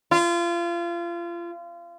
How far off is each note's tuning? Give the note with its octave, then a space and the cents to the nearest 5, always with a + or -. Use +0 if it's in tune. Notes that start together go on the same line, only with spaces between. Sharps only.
F4 -30